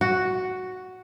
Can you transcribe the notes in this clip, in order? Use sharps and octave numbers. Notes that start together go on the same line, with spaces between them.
F#4